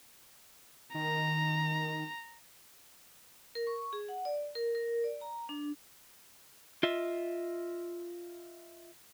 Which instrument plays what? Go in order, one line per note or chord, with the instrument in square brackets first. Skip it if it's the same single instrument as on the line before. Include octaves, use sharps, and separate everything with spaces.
[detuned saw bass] D#3 [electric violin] A#5
[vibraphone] A#4
C#6
G#4
F#5
D5
A#4
A#4
D5
A#5
D4
[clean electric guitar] F4 D#5 E5